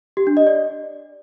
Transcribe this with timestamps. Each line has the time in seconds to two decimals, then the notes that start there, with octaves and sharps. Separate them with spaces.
0.17 G4
0.27 D4
0.37 D#5
0.47 D5